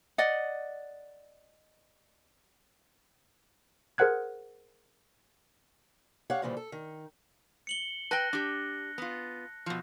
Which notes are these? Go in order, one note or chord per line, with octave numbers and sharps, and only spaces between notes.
D5 D#5 F#5
G#4 A#4 C5 F#5 F#6 G#6
G4 C#5 F5 F#5
A#2 C#3 E3 F3 G3
A4
D#3
C#7 F#7 G7
B4 G5 A5 F#6 A#6
D4 G4
B3 F4
B2 F3